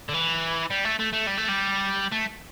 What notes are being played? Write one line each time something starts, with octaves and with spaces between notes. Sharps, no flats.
D3
E3
G3
A3
A3
A3
G3
A3
G3
A3